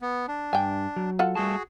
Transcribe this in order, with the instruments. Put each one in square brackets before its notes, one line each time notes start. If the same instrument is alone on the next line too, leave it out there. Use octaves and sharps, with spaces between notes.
[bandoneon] B3
D4
[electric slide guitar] G2 [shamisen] G5 G#5
[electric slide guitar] F#3
[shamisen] F4 A4 F#5
[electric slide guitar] G3 A3 A5 [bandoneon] F#4 G#4